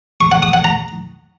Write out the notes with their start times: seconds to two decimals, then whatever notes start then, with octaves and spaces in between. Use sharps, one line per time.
0.21 C#6
0.32 F#5
0.42 D#6
0.53 F#5
0.64 A#5